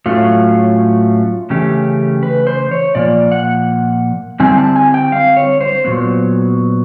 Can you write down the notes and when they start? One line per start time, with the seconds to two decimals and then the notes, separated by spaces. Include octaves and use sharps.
0.06 A2 F#3 A3 C#4 F4
1.50 C#3 E3 A3 C#4 G4
2.23 B4
2.47 C5
2.71 C#5
2.95 A#2 F3 A#3 D5
3.32 F#5
4.40 D3 G3 C4 E4 G#5
4.58 A5
4.76 G#5
4.94 G5
5.12 F5
5.37 C#5
5.61 C5
5.85 A#2 F#3 B3